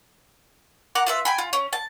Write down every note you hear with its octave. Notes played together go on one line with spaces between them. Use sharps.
A#4 F#5 D6
F4 B4 E5
G5 G#5 B5
F4
C#4
A5